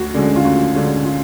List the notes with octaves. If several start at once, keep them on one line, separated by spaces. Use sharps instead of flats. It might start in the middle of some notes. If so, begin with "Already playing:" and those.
Already playing: D2 F#4
D3 G#3 C#4
F4
D2 F#4
D3 G#3 C#4
F4